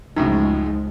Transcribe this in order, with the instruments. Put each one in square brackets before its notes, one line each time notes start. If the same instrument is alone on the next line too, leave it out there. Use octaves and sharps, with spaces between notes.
[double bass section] C#2 F3 G#3 [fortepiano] F#2 A2 C#3 [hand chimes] D#4